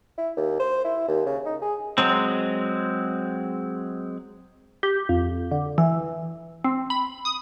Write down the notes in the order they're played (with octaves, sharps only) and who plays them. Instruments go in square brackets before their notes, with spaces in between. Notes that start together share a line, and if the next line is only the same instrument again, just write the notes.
[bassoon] E4
D#2
C5
E4
D#2
C#3
D#4
G#4
[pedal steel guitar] F#3 G#3 C4
[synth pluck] G4
F2
D3
E3
C4
B5
D#6